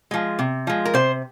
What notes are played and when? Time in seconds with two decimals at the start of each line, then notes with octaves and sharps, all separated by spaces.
0.11 F3 G#3
0.39 C3
0.67 F3 G#3
0.85 A#4
0.94 C3 C5